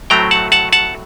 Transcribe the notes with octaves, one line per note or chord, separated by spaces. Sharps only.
A2 F#3 A3 C4 G5 A#5
F#5 A5
F#5 A5
F#5 A5